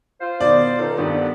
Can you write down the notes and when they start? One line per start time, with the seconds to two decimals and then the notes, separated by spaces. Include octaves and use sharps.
0.21 F4 C5
0.40 B2 D#3 D5
0.79 C#2 F3 D#4 A4
0.97 G2 A#2 D3 D#3 B3